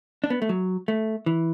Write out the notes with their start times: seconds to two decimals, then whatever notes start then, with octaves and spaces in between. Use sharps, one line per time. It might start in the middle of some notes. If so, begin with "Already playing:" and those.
0.24 D4
0.30 B3
0.42 A3
0.49 F#3
0.88 A3
1.26 E3